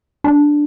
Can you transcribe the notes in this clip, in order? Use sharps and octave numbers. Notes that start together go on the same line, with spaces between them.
D4